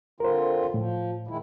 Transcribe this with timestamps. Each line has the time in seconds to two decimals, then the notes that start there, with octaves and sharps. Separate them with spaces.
0.20 D3 C4 F4 A#4 C5
0.74 A2 F3
1.28 D#3 G#3 E4